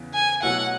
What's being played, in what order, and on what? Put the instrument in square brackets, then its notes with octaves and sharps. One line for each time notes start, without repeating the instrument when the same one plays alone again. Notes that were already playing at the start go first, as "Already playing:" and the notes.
Already playing: [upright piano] E2 C#3 E3 B3
[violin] G#5
[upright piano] B2 F#3 A3 E4 [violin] F#5